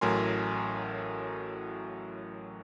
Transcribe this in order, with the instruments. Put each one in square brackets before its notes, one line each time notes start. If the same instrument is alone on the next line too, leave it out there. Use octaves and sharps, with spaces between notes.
[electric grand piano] A1 A2 F#3 A#4 G#5 C6